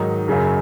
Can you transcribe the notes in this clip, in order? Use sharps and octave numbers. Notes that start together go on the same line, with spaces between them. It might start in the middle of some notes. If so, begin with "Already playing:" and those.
Already playing: G#2 D#3 F#3 D#4
F#2 C#3 F#3